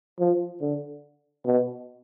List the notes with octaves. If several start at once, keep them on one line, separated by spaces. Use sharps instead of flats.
F3
D3
B2